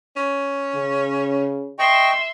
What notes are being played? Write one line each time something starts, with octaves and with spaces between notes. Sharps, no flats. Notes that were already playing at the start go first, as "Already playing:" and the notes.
C#4
C#3
D#5 E5 G5 C6 C#6